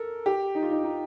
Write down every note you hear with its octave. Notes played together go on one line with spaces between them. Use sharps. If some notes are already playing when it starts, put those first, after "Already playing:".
Already playing: A4 A#4
G4
D#4
F4
D#4
D#4